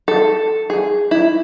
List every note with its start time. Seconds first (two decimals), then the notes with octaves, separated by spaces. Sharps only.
0.08 A4
0.70 G#4
1.11 E4